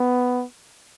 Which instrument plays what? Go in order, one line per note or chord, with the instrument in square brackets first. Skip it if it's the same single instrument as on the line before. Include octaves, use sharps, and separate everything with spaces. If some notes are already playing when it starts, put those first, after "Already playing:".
Already playing: [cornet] B3